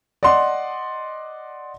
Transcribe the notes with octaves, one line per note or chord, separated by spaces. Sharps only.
D5 D#5 F#5 C6